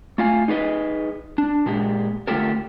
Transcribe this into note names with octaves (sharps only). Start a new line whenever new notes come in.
A3 F4 F5 G#5
D#4 G#4 B4 D#5
D4
A#2 G#3 G4
D3 A3 F4 G4 A4 A#4